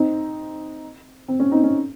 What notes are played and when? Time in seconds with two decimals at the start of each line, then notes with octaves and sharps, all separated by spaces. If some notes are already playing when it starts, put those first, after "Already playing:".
Already playing: C4 D#4
1.28 C4
1.40 C#4
1.51 C4 D#4
1.63 C#4